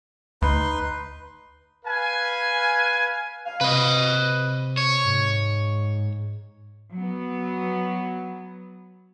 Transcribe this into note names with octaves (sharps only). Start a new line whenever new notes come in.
D2 D#4 B4 C6
B4 F5 G#5
F5
C3 B4 D#5
C#5
G#2
F#3 B3